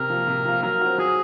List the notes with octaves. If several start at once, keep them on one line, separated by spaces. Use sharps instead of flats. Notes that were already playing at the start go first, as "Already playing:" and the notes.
Already playing: C3 A#4
F3 A#3
C3
F3 A#3
F#3 A#4
C4 F#4
F#3 G#4